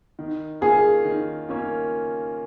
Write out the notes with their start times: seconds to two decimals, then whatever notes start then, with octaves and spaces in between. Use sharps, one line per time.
0.19 D#3
0.61 A#3 C#4 F4 G#4
1.05 D#3
1.49 A#3 C#4 F4